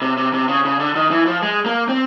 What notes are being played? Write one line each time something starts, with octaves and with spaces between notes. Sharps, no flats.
C3
C3
C3
C#3
C#3
D3
D#3
E3
F3
G#3
A#3
C4